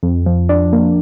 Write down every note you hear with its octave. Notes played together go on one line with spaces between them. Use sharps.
F2
F3
D4
A#3